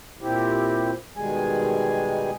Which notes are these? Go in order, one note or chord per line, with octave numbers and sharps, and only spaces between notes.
A#2 C4 E4 G4
B2 D#3 G3 G#3 G#4 G#5